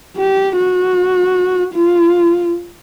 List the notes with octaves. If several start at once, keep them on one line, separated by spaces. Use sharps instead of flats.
G4
F#4
F4